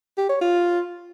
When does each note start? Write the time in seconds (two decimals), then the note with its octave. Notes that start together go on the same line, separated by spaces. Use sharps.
0.18 G4
0.30 C#5
0.41 F4